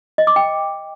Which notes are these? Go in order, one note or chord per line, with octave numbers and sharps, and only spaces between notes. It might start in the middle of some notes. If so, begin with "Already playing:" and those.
D#5
D6
G5